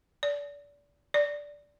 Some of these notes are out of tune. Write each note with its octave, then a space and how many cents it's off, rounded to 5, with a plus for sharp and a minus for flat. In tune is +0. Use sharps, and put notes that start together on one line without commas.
D5 -30
D5 -10